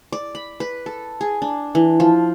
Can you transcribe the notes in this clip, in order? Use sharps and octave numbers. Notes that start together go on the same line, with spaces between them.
D5
B5
B4
A4
G#4
D4
E3
F3